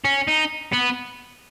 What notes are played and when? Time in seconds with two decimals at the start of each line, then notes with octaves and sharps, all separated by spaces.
0.05 C#4
0.28 D#4
0.73 B3